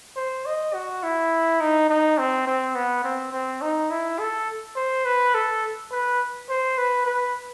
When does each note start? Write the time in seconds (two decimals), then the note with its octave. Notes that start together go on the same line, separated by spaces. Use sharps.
0.17 C5
0.46 D#5
0.74 F#4
1.03 E4
1.60 D#4
1.90 D#4
2.18 C4
2.47 C4
2.75 B3
3.04 C4
3.33 C4
3.62 D#4
3.91 E4
4.19 A4
4.76 C5
5.05 B4
5.34 A4
5.92 B4
6.49 C5
6.78 B4
7.06 B4